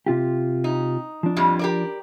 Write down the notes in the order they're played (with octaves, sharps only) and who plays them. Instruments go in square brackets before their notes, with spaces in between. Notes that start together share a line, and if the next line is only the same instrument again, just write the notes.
[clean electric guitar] C3 F4 G4
[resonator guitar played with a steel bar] D#4
[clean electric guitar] F3 D4
[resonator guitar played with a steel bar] F2 A2 G3
G4 A#4 D5